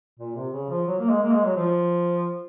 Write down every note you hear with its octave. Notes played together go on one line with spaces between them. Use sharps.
A#2
C3
C#3
F3
F#3
A#3
G#3
A#3
G#3
F#3
F3